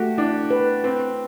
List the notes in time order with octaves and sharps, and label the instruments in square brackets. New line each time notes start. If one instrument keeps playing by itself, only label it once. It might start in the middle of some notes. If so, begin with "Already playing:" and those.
Already playing: [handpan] A3 [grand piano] F#4 G4
[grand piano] D4 [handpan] E4
[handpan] B4
[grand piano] C4 [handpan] B4